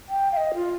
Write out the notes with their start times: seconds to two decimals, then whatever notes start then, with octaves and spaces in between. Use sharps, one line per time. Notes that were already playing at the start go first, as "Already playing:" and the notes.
0.09 G5
0.32 F5
0.37 D#5
0.54 F4